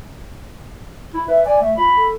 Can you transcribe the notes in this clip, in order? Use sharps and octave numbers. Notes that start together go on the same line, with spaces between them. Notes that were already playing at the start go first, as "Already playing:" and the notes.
E4
B4 E5
D5 G#5
A3 E5
F4 B5
A4